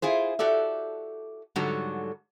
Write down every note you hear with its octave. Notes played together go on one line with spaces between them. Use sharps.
E4 F4 G#4 C5
F#4 G4 A4 D5 E5
G#2 D3 F#3 G3 F#4 A4